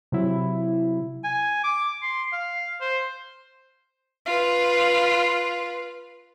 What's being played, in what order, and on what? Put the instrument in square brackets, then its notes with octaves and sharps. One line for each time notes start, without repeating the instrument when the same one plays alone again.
[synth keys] C3 F#3 E4
[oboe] G#5
D6
C6
F5
C5
[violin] F4 B4